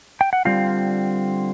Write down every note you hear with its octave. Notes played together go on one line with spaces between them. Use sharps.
G5
F#5
D3 G3 C4 F4 F5